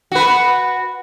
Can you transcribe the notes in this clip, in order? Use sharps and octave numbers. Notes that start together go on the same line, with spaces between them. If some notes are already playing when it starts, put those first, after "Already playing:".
F#4 B4